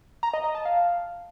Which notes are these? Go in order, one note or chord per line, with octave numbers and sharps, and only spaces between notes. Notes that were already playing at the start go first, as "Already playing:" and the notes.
A#5
D#5
D#5
A5
F5